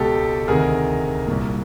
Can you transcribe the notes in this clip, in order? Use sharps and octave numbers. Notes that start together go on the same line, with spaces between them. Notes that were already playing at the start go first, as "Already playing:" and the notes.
Already playing: C#2 B2 G4 A4
D2 C3 D#3 G#4 A#4
C2 A#2